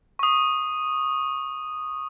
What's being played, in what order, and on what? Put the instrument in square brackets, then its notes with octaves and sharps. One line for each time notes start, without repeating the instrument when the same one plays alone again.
[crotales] C#6 D#6